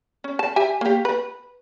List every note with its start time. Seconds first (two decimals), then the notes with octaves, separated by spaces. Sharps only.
0.24 C#4
0.39 A5
0.56 G4 E5 G#5
0.81 A#3 G4
1.05 B4